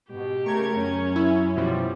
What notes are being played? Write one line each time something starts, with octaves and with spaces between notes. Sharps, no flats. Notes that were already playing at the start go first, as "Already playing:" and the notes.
G#2 B2 G4
C#3 A3 A#4 C#6 G#6
F#2 C#4
E4
B2 F3 G3